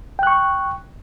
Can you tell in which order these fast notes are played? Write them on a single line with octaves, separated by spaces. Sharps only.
G5 F#6 C#6